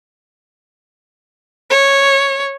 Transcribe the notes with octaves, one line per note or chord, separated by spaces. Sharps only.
C#5